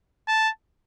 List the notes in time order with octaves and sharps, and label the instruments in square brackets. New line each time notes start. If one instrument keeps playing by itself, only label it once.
[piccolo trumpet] A5